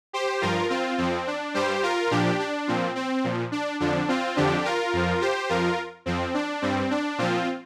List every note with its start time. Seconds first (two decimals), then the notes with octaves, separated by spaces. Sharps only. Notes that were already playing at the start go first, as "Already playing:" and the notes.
0.13 G4 C5
0.41 G2 F3 F4 A#4
0.70 C4 F4
0.98 F2 F3 C4
1.27 D4
1.54 G2 G3 G4 C5
1.83 F4 A#4
2.11 A#2 F3 D4 G4
2.39 D4
2.68 A#2 F3 C4
2.95 C4
3.24 A#2 F3
3.52 D4
3.80 F2 D3 F3 D4
4.08 C4 F4
4.36 F2 D3 F3 D4 G4
4.65 F4 A#4
4.93 F2 F3
5.21 G4 C5
5.49 F2 F3 F4 A#4
6.06 F2 F3 C4
6.34 D4
6.62 G2 G3 C4
6.91 D4
7.18 A#2 F3 C4 F4